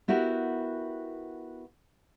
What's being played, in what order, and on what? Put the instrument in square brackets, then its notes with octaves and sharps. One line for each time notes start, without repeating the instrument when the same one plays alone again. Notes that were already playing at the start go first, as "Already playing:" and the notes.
[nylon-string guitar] B3 E4 F#4 G4 A#4